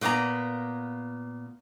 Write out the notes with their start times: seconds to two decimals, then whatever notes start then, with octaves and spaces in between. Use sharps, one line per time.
0.01 A#2 A#3 B3 D4 A#5